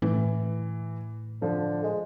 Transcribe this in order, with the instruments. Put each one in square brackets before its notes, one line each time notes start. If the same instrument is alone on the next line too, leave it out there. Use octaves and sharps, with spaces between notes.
[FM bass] A2 [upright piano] E3
[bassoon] D3 [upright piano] F3
[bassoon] G#3